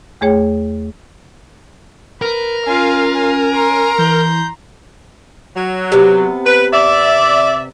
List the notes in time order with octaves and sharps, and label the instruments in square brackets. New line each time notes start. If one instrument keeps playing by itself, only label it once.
[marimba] E2 A3 G#4 C#5 G5
[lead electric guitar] A#4 [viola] B4
[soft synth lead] C#4 [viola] F4 F5 [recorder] G#5
[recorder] G#5
[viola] A#5 C6
[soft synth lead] E3 [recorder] G6
[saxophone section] F#3
[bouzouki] C3 B3
[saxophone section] B4
D5 E5